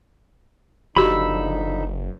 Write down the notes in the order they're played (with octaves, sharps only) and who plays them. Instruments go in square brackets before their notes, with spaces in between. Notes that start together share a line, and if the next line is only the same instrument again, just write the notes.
[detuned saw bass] F#1 [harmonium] D3 F3 D#4 [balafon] F#4 G4 [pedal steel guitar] B5 E6